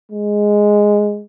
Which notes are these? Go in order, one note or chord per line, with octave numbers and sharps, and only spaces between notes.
G#3